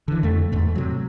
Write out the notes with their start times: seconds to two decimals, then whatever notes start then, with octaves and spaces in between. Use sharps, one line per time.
0.08 D3 E3
0.23 F2 A3
0.52 E2 G#2 A3
0.75 C3 F#3